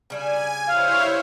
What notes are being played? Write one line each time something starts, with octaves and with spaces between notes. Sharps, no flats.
C#3 G3 D4 G#5
E4 C5 C#5 F5